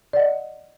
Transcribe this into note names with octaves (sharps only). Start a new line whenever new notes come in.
D5 D#5 F#5